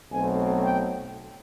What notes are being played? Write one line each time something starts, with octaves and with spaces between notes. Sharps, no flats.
B1 B2 F#3 A3 C4 G#5
G5